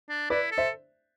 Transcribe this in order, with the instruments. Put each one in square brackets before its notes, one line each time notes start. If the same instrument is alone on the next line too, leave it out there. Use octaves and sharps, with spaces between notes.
[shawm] D4
[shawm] E4 [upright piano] B4 D5
[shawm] A4
[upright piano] C5 E5